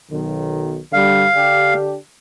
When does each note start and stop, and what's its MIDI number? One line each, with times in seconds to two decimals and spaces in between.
0.10 0.79 35
0.10 0.79 51
0.93 1.26 43
0.93 1.26 50
0.93 1.26 55
0.93 1.74 77
1.33 1.96 50
1.33 1.96 62
1.33 1.96 67